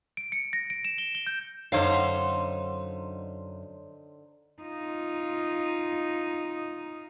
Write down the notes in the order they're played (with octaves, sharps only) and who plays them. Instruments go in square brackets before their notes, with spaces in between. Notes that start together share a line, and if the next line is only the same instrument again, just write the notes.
[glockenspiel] D7
C#7
A#6
D7
E7
G7
G7
G6
[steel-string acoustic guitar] F#2 F5 [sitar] D3 D#4 C5 [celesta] C#5
[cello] D#4 F4